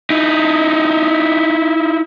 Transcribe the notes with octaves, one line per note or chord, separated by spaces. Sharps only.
D#4 E4